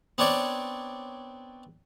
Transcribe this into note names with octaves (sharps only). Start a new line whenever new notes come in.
B3 C4 D4 C#5 D5